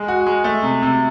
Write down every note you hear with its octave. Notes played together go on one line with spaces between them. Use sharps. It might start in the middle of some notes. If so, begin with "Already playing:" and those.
Already playing: G#3
F#4
G#3
A3
C3
C3